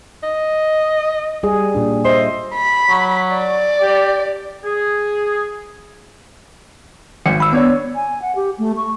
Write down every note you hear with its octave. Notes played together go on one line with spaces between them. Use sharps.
D#5
G3 G#4
A#2 D4
C5 D#5 E5
B5
F#3
D5
G4
G#4
G#1 C#7
B5 E6
B3 D4 C#5
G#5
F#5
G4
A3
C#6